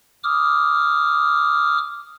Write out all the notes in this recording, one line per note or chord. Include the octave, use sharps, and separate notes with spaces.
D6 D#6 F6